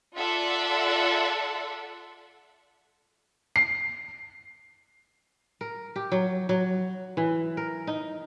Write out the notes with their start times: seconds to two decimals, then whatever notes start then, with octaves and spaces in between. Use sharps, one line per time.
0.16 F4 A4 D5 E5 F#5
3.56 C7
5.61 A#4
5.96 G4
6.12 F#3
6.49 F#3
7.17 E3
7.57 A#4
7.87 D#4